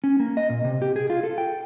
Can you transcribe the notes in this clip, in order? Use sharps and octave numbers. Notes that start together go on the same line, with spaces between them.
C#4
A#3
D#5
A#2
C3
G4
G#4
F4
A4
G5